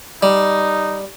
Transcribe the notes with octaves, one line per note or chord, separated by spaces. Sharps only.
G3 D#4